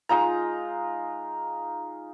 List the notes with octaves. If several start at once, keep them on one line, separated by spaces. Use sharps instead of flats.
G#3 D#4 F4 A#5